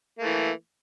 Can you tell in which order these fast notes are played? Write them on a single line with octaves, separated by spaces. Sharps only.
A#3 A3 E3